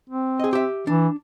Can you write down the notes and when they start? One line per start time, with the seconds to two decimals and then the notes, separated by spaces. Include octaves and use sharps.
0.10 C4
0.40 G#4 D#5
0.53 G4 E5
0.87 E3 D4